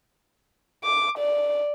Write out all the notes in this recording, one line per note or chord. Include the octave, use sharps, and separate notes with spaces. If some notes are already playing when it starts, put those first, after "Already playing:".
D6
D5